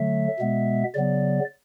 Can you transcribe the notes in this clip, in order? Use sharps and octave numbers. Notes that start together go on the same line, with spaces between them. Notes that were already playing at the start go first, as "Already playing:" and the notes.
Already playing: D3 F#3 A3 E5
B2 G#3 B3
C#3 F#3 B3 D5